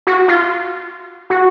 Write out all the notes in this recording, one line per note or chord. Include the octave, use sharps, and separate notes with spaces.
F#4
F4
F#4